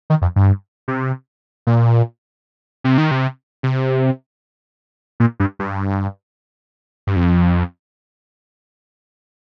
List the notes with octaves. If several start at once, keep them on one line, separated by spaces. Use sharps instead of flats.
D#3
F2
G2
C3
A#2
C3
D#3
C3
C3
A#2
G2
G2
G2
F2